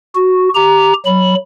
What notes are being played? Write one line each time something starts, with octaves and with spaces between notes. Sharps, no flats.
F#4
G4 A#5
F#3 B5